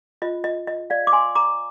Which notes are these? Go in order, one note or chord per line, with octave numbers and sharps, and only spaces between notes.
F4 C5 D#5
D#5
D#5
D5 F5
D6
G#5 C6
A#5 D6